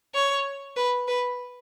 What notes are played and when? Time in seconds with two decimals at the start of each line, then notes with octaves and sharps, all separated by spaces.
0.15 C#5
0.77 B4
1.08 B4